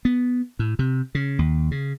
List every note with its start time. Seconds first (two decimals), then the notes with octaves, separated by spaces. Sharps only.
0.05 B3
0.59 A2
0.79 C3
1.15 C#3
1.39 D#2
1.71 C#3